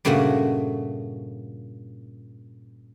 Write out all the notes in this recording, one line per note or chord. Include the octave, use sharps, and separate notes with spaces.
G2 A#2 C#3 F3 A3 F#4